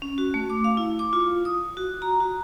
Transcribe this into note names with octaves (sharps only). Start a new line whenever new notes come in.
C#4
F#4
A3
D6
F5
E4
D6
F4
D#6
F#4
A#5
F#4